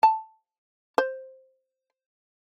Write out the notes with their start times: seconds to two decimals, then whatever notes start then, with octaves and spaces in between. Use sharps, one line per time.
0.03 A5
0.98 C5